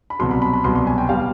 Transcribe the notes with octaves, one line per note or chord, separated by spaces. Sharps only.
B5
C2 B2 F#3 C6
B5
B5
B5
C2 B2 F#3 C6
C6
G#5
G5
B2 G3 F5